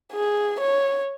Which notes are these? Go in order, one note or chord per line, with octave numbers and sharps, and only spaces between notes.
G#4
C#5